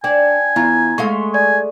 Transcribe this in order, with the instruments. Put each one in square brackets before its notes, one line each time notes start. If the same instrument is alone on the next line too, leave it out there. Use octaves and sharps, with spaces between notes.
[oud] D4 [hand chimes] G5 [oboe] G#5
[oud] E2 F4 [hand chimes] B3 E4 A#5
[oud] G#3 A3 F5 [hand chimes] C#6
[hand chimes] D5 [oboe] G#5